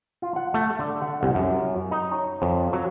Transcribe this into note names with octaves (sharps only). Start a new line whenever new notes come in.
F4
F#5
A3
D3
F#5
C2
F#2
D#4
C#5
F2
F#3